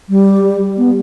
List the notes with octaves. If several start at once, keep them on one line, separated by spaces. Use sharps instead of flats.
G3
B3